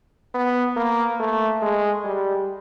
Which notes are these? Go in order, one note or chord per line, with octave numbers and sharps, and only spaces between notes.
B3
A#3
A3
G#3
G3